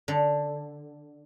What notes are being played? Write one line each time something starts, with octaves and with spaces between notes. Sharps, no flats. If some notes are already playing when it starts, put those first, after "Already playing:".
D3